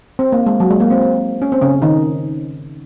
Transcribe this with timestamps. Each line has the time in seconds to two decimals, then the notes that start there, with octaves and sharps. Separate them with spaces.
0.19 C4
0.32 A#3
0.46 G#3
0.60 F#3
0.70 G#3
0.80 A#3
0.90 C4
1.01 C4
1.42 C#4
1.52 C4
1.62 C#3 C#4
1.82 D#3 D#4